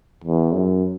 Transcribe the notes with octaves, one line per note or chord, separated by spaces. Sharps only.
E2
F#2